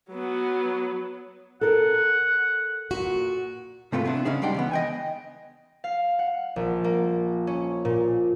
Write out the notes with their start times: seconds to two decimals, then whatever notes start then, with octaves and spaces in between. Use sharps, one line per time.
0.10 F#3 B3
1.61 A4 A#4 F#5
2.91 A#2 F#4
3.92 G#2 C3 A3 F4 B4
4.05 B3 C4 D4 E4
4.25 C#3 C#4 D#4 G#4
4.42 G3 G#3 D4 D5 F#5 G5
4.54 C#2 E3 B3
4.71 D#5 G5 G#5
5.84 F5
6.19 F#5
6.56 A#1
6.84 A#3
7.47 C#4
7.85 A#2